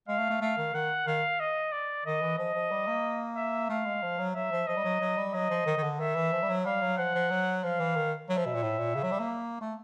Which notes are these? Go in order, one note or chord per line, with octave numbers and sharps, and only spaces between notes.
G#3 F5
A3
A3
A3 F5
D#3
D#3 F#5
D#3 F5
D#5
D5
D#3 D#5
E3
F3 D#5
F3
G3
A#3
E5
A3 F5
G#3
F3
F#3
F#3 E5
F3
F3 D#5
G3
F#3
F#3
G3
F#3 D#5
F3
D#3
D#3
D3
D#3 E5
E3
F3
G3
F#3
G3 F5
F#3
F3 F#5
F3
F#3
F3 F5
E3
D#3
F#3 E5
F3
B2
A#2
A2
A#2
C#3
F#3
G3
A#3
A3